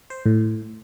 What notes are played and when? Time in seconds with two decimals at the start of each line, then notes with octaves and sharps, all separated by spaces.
0.10 C5
0.26 A2